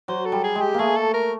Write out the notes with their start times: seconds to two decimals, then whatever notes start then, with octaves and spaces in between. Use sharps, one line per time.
0.08 F#3 C5
0.26 A4
0.32 G3
0.44 G#4
0.55 G#3
0.61 G4
0.74 A3 A#3 G#4
0.96 A4
1.14 A#4